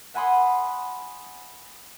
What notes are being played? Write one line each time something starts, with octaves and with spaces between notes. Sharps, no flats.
E5 F#5 G#5 B5 C6 D#6